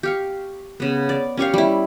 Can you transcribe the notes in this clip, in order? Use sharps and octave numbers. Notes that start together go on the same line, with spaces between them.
G4 F5 C#6
C#3 B3
D5
C#4 G4 C#5 F5
G3 E4